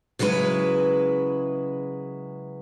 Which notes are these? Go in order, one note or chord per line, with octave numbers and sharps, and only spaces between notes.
C#3 F#3 G#3 E4 B4